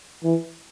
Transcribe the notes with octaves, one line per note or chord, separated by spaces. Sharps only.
E3